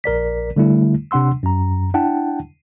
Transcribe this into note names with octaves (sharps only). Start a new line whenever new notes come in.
A#1 A#4 D5 B6
D3 G3 A3 E4
C3 D4 F#5 C6 E6
F#2 A#5
D4 E4 F#5 G5 A5